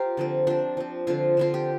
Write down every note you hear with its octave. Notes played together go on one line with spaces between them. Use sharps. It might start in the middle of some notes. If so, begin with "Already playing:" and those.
Already playing: F4 G4 A#4 C5
D3 F3 C4
F3 C4 D4
F3 C4
D3 F3 C4 F4
D3 F3 C4 F4
G4